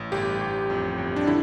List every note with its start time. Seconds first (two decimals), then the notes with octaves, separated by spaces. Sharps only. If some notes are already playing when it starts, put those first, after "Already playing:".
Already playing: A1
0.12 G1 G4
0.41 G1
0.70 F2
0.98 G1
1.16 D4
1.27 D3 E4